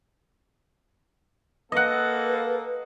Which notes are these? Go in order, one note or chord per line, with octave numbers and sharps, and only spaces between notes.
A#3 A4 B4 D#5 F#5